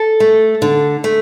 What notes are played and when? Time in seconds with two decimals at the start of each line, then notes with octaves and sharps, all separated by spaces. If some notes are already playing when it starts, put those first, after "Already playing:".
Already playing: A4
0.20 A3
0.62 D3
1.04 A3